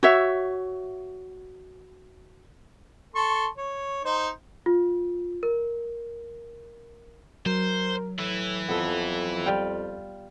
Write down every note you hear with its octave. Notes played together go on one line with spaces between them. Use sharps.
F#4 C#5 E5
A4 C6 C#6
C#5
D#4 C5
F4
A#4
F#3 A#4 C5
A2 E3 E4
F2 B3 A4
G3 F4 G5